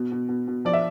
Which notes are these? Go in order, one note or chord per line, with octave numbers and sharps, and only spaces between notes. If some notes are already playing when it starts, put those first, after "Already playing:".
Already playing: B2
B2
B2
B2
F3 D5
E5